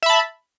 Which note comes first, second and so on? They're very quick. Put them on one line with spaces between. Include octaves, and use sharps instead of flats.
E5 B5 A5